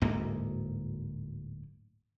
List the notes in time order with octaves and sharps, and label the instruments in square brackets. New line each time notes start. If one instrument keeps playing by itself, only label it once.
[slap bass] D1 D2 G#2 A#3